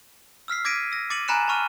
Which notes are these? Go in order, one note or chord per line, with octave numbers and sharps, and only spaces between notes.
E6 F6 B6 C7
D6 G#6 A#6 B6 D7 D#7
E6 A#6
D6 A6 C#7 D#7 F#7
G#5 A#5 B5 F#6 C#7 E7
A5 B5 C#6 F6 D#7